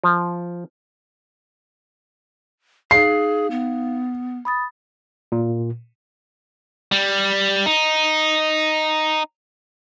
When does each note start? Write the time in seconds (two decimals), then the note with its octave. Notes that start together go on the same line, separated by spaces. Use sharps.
0.04 F3
2.91 D#4 G#4 F5 C7
3.51 B3
4.45 B5 D#6 A6
5.32 A#2
6.92 G3
7.66 D#4